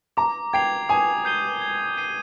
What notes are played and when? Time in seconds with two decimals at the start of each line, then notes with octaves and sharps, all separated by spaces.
0.17 A#5 D6
0.53 G5 G#6 C7 F7
0.89 G#5 D#6
1.25 G6 C7 D#7 G7
1.61 G#6
1.97 C7 D#7